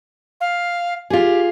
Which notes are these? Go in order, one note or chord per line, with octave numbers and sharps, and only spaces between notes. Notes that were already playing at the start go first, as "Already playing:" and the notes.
F5
F4 G4 G#4